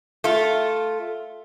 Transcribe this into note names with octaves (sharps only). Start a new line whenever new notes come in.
A3 F4